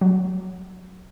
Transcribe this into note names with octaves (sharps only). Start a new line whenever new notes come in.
F#3